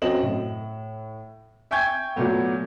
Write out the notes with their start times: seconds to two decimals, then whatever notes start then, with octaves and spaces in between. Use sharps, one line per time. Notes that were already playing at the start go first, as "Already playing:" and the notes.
0.02 F#2 F#3 C4 D#5 E7 F#7
0.23 A2
1.71 E5 G5 G#5 C#6 G6 G#6
2.16 A#2 F#3 A3 B3